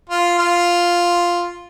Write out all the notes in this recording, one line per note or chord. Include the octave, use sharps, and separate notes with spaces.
F4
F4